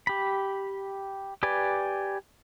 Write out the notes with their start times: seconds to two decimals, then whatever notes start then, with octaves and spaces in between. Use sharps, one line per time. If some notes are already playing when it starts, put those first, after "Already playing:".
0.07 G4 B5
1.43 G4 B4 D5 G#5